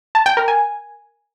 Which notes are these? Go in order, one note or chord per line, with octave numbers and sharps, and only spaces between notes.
A5
G5
A#4
G#5